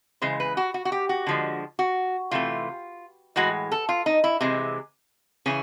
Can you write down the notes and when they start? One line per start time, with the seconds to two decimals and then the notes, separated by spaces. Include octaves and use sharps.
0.22 C#3 E3 G#3 C5
0.40 B4
0.57 F#4
0.74 F#4
0.85 F#4
0.92 G4
1.09 F#4
1.27 D3 F3 G#3
1.79 F#4
2.31 C3 E3 A3 F4
3.36 A2 E3 G#3 F#4
3.72 A4
3.89 F4
4.06 D#4
4.24 E4
4.41 C3 E3 G#3
5.46 C#3 E3 C#4